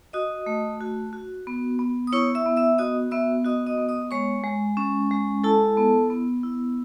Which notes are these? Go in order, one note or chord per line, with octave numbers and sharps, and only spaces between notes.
F#4 D#5 D#6
A3
F#4
F#4
B3
B3
D#6
E4 C#5 C#6
E5 E6
B3
E5 E6
F#4 D#5 D#6
B3 E5 E6
F#4 D#5 D#6
D#5 D#6
B3
D#5 D#6
G#3 C#5 C#6
G#3
C#4
G#3
E4 A4 A5
B3
B3
E4